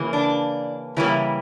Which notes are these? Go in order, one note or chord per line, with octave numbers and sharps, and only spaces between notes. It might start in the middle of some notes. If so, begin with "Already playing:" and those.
Already playing: C#3 E3 A#3
D4
C#3 E3 G3 A#3 E4